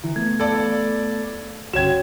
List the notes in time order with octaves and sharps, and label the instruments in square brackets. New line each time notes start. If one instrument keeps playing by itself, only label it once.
[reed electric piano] D3 E3 [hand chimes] E4
[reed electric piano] A3 B3 [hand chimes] G#6
[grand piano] A4 D5 [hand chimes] F5 B5 G#6
[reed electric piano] G2 D3 C#4 [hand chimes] F#4 C#5 G5 [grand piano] G#6 E7